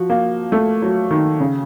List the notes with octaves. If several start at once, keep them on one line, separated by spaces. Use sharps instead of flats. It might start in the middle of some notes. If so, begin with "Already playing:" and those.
Already playing: F3 F#4
A#3
A3
F#3
D#3
C#3